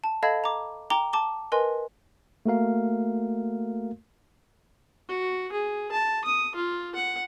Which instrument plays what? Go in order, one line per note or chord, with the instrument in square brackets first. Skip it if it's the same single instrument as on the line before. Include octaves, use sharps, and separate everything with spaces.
[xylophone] A5
A4 D#5 F5 A5 B5 G#6
A#5 D6
G5 A#5 D6 G7
A5 D6 G7
A#4 B4 D#5 G#5 C6
[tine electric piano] A3 A#3 F#4 A#4 F5
[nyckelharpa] F#4
G#4
A5
D#6
F4
F#5